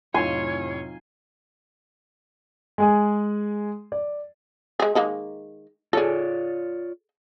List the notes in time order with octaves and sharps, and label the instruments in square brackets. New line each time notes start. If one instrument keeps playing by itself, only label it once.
[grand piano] F1 A2 [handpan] F#3 D#4 F4 [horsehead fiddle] C#5 [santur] G#5 C6
[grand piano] G#3 G#4 G#5
D5
[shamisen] G#3 G#4
D#3 G#3 A#3
[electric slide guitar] F4 C#5 D5 [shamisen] G#4 A4